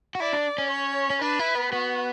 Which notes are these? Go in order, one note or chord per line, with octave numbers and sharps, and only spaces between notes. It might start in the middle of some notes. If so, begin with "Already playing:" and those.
F#4
E4 D5
D4
C#4
C#5
C#4
D4 B4
E4
B3
B3 F#4